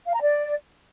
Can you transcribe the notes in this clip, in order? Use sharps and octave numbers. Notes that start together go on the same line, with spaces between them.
F5
A#5
D5